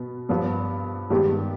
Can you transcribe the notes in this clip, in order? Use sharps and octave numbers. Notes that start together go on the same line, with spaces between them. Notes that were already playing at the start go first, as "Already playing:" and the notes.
Already playing: B2 B3
G2 F3 B3
G2 D#3 G#3 B3 G4